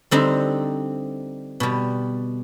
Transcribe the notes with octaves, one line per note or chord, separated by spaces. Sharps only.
D3 G3 C4 D#4
B2 G3